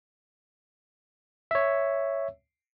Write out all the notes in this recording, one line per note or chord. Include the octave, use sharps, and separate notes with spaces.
C#5 E5